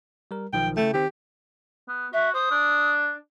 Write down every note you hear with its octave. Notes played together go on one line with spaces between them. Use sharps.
G3 A#4
B1 D#3 F3 G5
C#3 A3 E4 G5
D#3 C4 G4
B3
F#4 E5
C5 D#6
D4